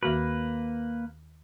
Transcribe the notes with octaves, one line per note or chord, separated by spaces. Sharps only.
D#2 D#3 A#3 F#4 B4